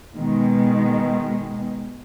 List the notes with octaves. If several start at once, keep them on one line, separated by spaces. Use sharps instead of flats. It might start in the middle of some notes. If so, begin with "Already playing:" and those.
B2 D#3 G#3